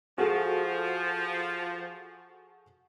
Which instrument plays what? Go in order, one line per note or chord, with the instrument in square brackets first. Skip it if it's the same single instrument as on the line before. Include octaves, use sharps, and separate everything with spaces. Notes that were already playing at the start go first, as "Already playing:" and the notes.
[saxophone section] F3 [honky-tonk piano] F#4 G#4 A4